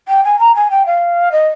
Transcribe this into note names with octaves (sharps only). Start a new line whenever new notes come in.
G5
G#5
A#5
G#5
G5
F5
D#5